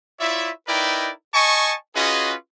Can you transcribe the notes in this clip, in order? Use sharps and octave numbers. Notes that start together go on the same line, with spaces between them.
E4 F4 C#5 D5 E5
D#4 E4 A#4 B4 D5 G5
D#5 G#5 A5 C#6
C#4 F4 F#4 G#4 B4 D#5